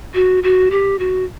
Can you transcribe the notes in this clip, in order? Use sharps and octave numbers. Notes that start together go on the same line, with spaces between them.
F#4
F#4
G4
F#4